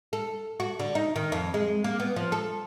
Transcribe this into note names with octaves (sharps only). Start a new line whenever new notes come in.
A4
F#4
D3
D#4
D#3
F2
G#3
A#3
B3
F3
A4